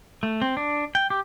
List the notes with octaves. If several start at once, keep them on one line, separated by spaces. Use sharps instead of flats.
A3
C4
D4
G5
G4